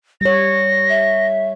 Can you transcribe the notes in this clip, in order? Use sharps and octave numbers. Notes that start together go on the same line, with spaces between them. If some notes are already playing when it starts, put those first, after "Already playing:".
G3 C#5 A#6
E5